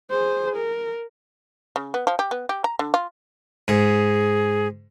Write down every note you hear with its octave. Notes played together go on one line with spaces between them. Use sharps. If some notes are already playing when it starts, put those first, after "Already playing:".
G#4 C5
A#4
C#3
B3
F3
G4
B3
G4
A#5
D3
F4
G#2 G#4